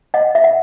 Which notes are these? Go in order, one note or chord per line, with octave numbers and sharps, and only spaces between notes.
D#5 F#5
E5
F#5